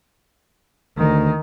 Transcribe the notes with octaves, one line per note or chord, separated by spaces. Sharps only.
D2 D#3